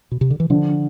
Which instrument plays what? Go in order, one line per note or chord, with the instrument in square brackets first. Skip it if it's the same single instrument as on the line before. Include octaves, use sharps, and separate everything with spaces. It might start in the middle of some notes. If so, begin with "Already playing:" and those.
[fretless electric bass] B2
C3
D3
E3
[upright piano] D3 [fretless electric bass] F3